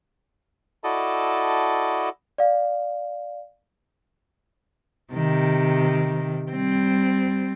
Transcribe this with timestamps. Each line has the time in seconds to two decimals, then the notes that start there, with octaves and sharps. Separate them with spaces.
0.84 E4 F#4 A4 D5 D#5 A5
2.38 D5 F5
5.13 C3 D#3
6.51 G3 C4